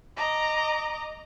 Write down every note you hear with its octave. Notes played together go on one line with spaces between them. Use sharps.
D#5 A#5 D6